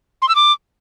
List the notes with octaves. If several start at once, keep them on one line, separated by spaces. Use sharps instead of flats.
C6
E6
D6